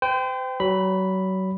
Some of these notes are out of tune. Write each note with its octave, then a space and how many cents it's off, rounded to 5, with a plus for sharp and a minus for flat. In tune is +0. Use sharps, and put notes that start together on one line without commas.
C5 -40 G5 +0
F#3 +30 B5 +0